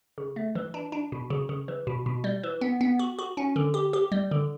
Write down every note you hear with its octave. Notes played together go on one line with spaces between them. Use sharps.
C#3
A3
E3
D4
D4
B2
C#3
C#3
E3
B2
B2
G3
E3
B3
B3
F#4
F#4
C#4
D3
G4
G4
G3
D3